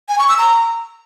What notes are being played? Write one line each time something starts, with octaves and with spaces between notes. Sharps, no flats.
G#5
C#6
E6
A#5